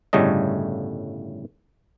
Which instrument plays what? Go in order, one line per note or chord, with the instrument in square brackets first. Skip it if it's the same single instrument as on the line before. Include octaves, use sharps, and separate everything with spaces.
[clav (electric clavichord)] G1 A2 C#3 G3 A3 D#5